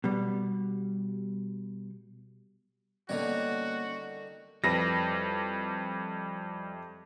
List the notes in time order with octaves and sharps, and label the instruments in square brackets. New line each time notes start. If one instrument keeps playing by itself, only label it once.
[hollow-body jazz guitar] B2 G3
[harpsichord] D3 D#3 G3 [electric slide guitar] A#3 B3 C#4 [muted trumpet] F#4
[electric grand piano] F2 A#6 [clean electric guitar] G3 E4 B4